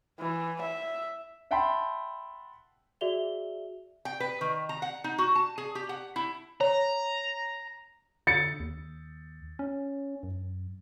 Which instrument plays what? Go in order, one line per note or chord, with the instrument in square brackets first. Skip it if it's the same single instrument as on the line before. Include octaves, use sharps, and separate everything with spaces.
[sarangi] E3
E5
[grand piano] E5 F#5 G5 A5 B5 C6
[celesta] F#4 G#4 D5 E5 F7 G7
[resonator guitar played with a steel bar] G5
B4
D#3
A#5
F#5
D#4
F#4
A5
G#4
G4
F#5
E4
[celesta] C#5 [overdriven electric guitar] A#5
[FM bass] D3 [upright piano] A6 C#7
[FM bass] D#2
C#4
F#2